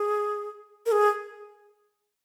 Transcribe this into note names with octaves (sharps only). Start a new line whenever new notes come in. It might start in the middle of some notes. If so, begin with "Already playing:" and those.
Already playing: G#4
A#4
G#4